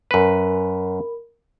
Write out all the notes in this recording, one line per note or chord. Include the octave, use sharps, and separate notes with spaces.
F#2 A#4 B4 B5